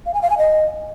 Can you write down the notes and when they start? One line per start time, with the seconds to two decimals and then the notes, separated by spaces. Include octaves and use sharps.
0.06 F5
0.14 G#5
0.22 F5
0.30 G#5
0.38 D#5